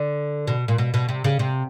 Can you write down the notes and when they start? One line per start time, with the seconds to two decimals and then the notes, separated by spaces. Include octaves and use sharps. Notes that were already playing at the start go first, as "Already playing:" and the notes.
Already playing: D3
0.47 B2
0.68 A#2
0.78 B2
0.94 B2
1.09 C3
1.24 C#3
1.39 C3